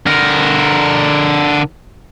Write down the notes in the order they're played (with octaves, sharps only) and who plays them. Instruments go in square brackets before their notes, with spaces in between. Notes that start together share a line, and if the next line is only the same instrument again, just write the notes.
[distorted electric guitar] D3 A#4